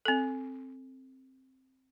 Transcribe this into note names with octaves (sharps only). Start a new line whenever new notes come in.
C4 A4